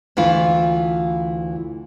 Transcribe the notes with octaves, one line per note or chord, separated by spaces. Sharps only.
D2 E3 F4